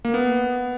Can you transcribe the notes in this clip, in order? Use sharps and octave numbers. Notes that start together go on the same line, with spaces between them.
A#3
B3